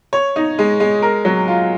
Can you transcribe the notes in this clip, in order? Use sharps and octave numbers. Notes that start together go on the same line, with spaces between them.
C#5
D#4
G#3
G#3
A#4
F#3
F4